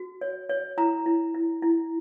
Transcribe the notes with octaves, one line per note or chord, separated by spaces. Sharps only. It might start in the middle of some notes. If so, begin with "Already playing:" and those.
Already playing: F#4
C#5
C#5
E4 A#5
E4
E4
E4